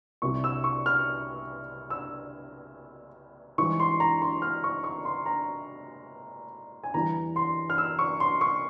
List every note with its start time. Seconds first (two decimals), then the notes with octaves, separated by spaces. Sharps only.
0.22 C2 C3 G3 C#6
0.44 E6
0.64 C#6
0.86 F6
1.90 E6
3.58 G#2 E3 G3 C#6
3.80 C6
4.00 A#5
4.22 C6
4.42 F6
4.64 C#6
4.84 C#6
5.05 C6
5.26 A#5
6.84 G#5
6.94 E2 E3 G3 A#5
7.36 C6
7.70 F6
7.78 E6
7.99 C#6
8.20 C6
8.41 C#6